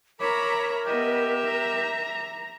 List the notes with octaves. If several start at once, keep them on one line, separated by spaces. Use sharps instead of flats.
A#4 C#5 E5 A#5 B5 D6
B3 G4 D#5 E5
A#5